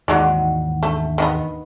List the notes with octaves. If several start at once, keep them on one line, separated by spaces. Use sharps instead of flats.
D#2 G#2 E3 F#3 G#3 D#4 D5 F#5
A3 D4 F#4
D#3 A#3 B3